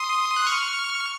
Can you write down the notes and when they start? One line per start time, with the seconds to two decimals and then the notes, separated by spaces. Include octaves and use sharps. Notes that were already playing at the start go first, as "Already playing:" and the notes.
Already playing: C6 D#6
0.36 F#6
0.47 C#6 F6